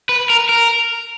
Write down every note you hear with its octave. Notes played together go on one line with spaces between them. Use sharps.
B4
A#4
A#4